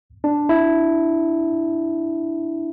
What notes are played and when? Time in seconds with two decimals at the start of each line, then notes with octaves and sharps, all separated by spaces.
0.24 D4
0.49 E4